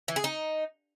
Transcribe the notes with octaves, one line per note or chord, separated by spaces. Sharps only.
E3
G#4
D#4